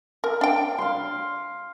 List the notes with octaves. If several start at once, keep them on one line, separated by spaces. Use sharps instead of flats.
A#4
D4 G5
F5 C6